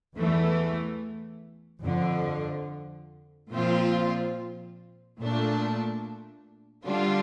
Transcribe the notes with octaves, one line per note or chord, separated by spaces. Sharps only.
E2 E3 A3
F2 D3 F3
A#2 F3 C4 F4
A#2 A3 D4
D3 G3 D4 F4